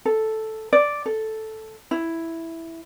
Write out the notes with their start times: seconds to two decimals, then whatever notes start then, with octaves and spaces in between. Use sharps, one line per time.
0.05 A4
0.73 D5
1.06 A4
1.91 E4